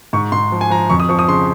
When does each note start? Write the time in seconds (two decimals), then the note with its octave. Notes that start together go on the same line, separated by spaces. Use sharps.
0.13 G#2 C#6
0.32 G#2 C6
0.52 F3
0.61 G#5
0.70 F3 A#5
0.89 F2 C#6
1.00 D#6
1.09 F3 C#6
1.19 D#6
1.28 C#3 C6